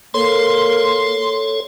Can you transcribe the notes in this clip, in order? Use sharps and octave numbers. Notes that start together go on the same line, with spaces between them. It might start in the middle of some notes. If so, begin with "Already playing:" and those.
A#3 A4 C#5 C6